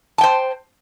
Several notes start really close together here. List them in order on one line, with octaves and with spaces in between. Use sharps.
A5 G5 C5